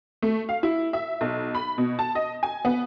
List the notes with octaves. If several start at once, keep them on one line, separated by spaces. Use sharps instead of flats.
A3
F5
E4
E5
B1
B5
B2
A5
D#5
G#5
B3